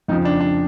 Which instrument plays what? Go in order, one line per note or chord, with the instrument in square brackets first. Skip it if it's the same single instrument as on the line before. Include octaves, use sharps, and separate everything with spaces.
[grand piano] F2 C#3 F3 D#4
D4
D4